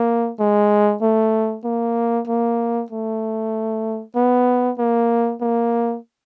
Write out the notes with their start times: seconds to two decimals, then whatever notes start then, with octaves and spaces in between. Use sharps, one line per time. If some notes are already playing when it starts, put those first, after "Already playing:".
Already playing: A#3
0.39 G#3
1.02 A3
1.64 A#3
2.27 A#3
2.90 A3
4.16 B3
4.78 A#3
5.41 A#3